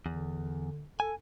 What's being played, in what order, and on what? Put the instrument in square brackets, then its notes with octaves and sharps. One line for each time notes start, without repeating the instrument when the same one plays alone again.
[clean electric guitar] E2 [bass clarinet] D3
[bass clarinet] A4 [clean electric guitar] G#5